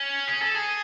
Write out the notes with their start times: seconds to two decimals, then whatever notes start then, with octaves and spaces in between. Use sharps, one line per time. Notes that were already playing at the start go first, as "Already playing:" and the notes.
Already playing: C#4
0.28 G#4
0.42 A4
0.55 G#4